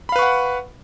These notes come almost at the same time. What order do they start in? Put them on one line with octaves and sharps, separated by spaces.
B5 F5 B4 C#6 F#5